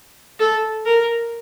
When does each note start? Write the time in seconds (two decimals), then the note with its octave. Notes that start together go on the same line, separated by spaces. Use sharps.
0.40 A4
0.86 A#4